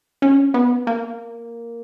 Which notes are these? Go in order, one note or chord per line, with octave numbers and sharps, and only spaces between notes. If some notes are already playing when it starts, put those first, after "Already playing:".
C#4
B3
A#3